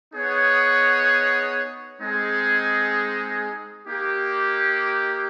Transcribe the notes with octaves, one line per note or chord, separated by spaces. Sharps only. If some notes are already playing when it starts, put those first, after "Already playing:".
B3 D#4 G#4 C#5 F#5
G#3 C4 D#4 G#4
A#3 D#4 G4